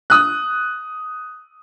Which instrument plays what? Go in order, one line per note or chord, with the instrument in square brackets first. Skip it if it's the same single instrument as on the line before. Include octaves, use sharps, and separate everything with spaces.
[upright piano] D#6 F#6